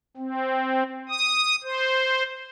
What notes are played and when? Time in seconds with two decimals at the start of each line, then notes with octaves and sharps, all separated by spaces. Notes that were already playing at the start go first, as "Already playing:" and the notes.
0.17 C4
1.09 D#6
1.63 C5